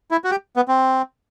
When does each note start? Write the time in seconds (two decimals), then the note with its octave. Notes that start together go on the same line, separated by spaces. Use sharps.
0.11 E4
0.24 F#4
0.31 G4
0.56 B3
0.68 C4